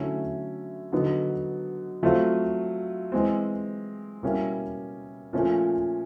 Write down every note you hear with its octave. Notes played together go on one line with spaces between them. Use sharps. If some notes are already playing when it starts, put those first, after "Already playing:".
Already playing: D3 F#3 A3 C#4 E4
D3 F#3 B3 D#4
F#3 A3 C4 F4
E3 G#3 C4
B2 G3 A#3 C#4 E4
A#2 F3 A3 C#4 F4